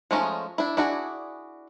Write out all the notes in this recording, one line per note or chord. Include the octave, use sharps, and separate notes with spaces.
F3 G#3 A3 C#4 D#4
D4 E4
D4 E4 F#4 G#4 D5